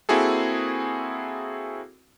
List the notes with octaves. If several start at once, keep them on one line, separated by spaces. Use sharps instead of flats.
A#3 C4 E4 F#4 G#4 A4